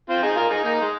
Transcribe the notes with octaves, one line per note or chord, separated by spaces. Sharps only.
C4 F4
D#4 G#4
F4 A#4
D#4 G#4
A#3 D#4
G#3